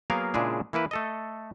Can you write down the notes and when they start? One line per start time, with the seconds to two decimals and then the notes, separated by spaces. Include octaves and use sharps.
0.10 F#3 A#3 B3 G#4 A#4 F5
0.34 A#2 C#3 G#3 D4 E4 G#4
0.73 E3 A#3 E4 B4
0.91 A3 A4 D#5